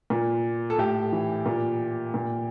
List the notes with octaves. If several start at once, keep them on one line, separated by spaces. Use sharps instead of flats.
A#2
A4
A2 G4
E3
A#2
A#2